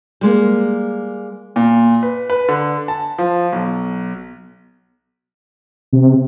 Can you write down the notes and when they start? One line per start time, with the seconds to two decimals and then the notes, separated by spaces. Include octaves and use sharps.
0.21 G3 G#3 A#3
1.56 A#2
2.03 B4
2.30 B4
2.49 D3
2.88 A5
3.18 F3
3.52 B1
5.93 C3